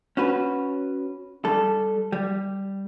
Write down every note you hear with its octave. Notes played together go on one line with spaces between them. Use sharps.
C#4 F#4 B4
G3 A4
G3